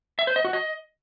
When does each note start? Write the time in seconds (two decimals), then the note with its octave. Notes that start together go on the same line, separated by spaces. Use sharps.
0.19 E5
0.27 C5
0.36 D#5
0.45 F#4
0.53 D#5